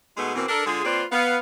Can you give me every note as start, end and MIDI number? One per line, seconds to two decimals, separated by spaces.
0.17 0.34 47
0.17 0.34 56
0.17 0.34 57
0.17 0.34 59
0.17 0.34 63
0.17 0.34 68
0.36 0.47 47
0.36 0.47 52
0.36 0.47 58
0.36 0.47 60
0.49 0.64 62
0.49 0.64 69
0.49 0.64 70
0.66 0.84 50
0.66 0.84 56
0.66 0.84 65
0.66 0.84 68
0.85 1.03 58
0.85 1.03 60
0.85 1.03 65
0.85 1.03 71
0.85 1.03 72
0.85 1.03 74
1.12 1.37 59
1.12 1.37 77